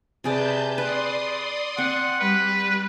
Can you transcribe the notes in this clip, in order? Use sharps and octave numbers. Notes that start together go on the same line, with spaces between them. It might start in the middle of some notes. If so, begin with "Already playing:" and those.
C3 G#4 B4 D5 A5 G6
B4 D5 C6 D#6
C4 F#5
G3 B4